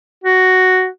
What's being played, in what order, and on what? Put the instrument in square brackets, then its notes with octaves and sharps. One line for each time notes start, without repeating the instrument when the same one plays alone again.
[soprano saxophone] F#4